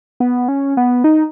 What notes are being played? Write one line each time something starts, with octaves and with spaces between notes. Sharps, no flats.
B3
C#4
B3
D#4